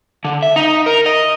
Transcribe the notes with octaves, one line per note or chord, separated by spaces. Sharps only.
D3
E5
D#4
A#4
D#5